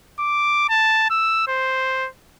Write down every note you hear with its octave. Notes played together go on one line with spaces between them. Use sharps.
D6
A5
E6
C5